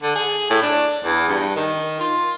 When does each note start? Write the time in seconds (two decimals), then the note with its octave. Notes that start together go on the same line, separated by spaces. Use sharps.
0.03 D3
0.15 G#4
0.50 A2
0.62 D4
1.04 E2
1.29 G2
1.56 D#3
2.00 F4